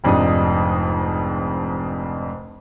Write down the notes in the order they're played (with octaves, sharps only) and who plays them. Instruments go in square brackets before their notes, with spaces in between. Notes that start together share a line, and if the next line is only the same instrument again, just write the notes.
[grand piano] F1 F2 G#2 D4 D#4 D#6